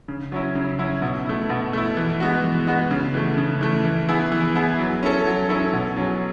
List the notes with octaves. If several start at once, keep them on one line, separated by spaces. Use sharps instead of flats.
C#3
F#3 C#4 E4
C#3
F#3 C#4 E4
B2
A3 E4
B2
A3 E4
E3
G#3 B3 F#4
E3
G#3 B3 F#4
C#3
E3 A3
C#3
E3 A3
E3
B3 E4 G#4
E3
B3 E4 G#4
F#3
C#4 E4 A4
F#3
C#4 E4 A4
B2
F#3 C#4 G#4